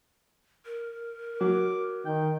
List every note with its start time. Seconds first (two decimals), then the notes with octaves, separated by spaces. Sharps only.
0.65 A#4
1.41 F#3 D6
2.06 D#3 G5